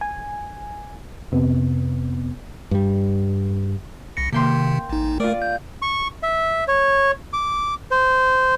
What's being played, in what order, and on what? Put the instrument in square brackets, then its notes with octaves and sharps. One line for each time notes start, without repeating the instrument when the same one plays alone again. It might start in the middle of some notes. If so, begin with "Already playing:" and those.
[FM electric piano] G#5
F2 C3 B3
[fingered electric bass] G2 G3
[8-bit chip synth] C2 A#6 C#7
[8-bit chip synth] C3 D#3 [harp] A#3 G5 C6
[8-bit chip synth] A1 D#4
[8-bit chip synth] A3 A#4 [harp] F4 D5
[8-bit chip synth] G6
[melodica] C#6
E5
C#5
D6
C5